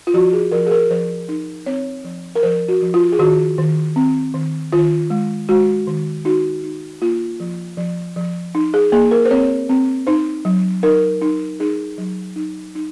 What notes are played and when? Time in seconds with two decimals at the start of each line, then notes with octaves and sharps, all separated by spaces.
0.07 F4
0.14 F3 F#4
0.33 G#4
0.52 F3 A#4
0.67 G#4
0.71 A#4
0.90 F3 C5
1.29 D#4
1.66 C4 C#5
2.04 F3
2.35 A#4
2.43 F3 C5
2.68 F#4
2.82 F3
2.94 F4
3.12 G#4
3.19 D#3 F#4
3.58 D#3
3.96 C4
4.34 D#3
4.73 D#3 F4
5.10 G#3
5.49 G#3 F#4
5.87 D#3
6.25 D#4 F#4
6.63 D#4
7.02 A#3 F4
7.40 F3
7.77 F3
8.16 F3
8.55 D#4
8.74 G#4
8.92 A#3 G#4
9.11 A#4
9.25 C5
9.31 C4 C#5
9.69 C4
10.07 D#4 C5
10.45 F#3
10.83 D#4 A#4
11.21 D#4
11.60 D#4 G#4
11.98 F#3
12.36 D#4
12.75 D#4